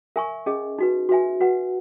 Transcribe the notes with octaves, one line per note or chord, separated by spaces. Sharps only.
A#4 E5 G#5 C#6
C#4 G#4 D#5
D#4 F#4 B4
F#4 B4 E5 G#5
F#4 B4 F#5